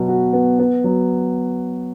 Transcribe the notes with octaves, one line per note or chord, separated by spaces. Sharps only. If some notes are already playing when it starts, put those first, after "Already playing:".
Already playing: B2 F#3 B3
F#4
B3
B3
F#3